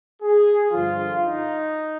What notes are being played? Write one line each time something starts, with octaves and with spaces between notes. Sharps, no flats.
G#4
G2 D3 F3 F4
D#4